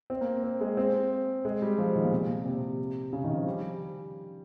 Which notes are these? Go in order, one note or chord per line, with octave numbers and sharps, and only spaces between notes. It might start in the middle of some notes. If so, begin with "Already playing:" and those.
C4
A#3
C4
G#3
C4
G#3
G3
F3
D#3
A#2
C3
A#2
C3
C#3
D#3
F3
G3